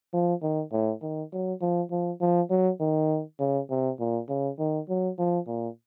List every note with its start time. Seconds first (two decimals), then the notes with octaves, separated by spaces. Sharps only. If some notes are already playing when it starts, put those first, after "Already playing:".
0.14 F3
0.42 D#3
0.72 A2
1.02 D#3
1.32 F#3
1.61 F3
1.91 F3
2.21 F3
2.50 F#3
2.81 D#3
3.40 C#3
3.70 C3
4.00 A#2
4.29 C#3
4.59 D#3
4.89 F#3
5.19 F3
5.47 A#2